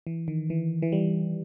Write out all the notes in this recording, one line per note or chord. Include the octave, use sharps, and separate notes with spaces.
E3
D#3
E3
E3
G3